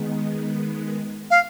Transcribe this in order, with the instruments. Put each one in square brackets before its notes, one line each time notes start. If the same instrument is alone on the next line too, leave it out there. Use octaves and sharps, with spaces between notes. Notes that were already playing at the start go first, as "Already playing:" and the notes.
Already playing: [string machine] D#3 G#3 B3
[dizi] F5